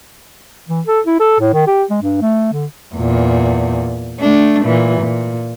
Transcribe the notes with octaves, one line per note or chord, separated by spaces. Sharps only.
E3
A4
E4
A4
A2
D#3
G4
G#3
G2
A3
D3
E2 A#2
A3 D4
A#2 E3
A#2